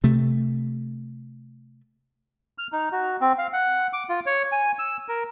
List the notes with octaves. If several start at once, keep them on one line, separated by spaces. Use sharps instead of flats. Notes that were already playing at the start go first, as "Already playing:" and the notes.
C3 A3
F6
D#4
F#4
C4
F5
F#5
D6
F4
C#5
G#5
E6
A#4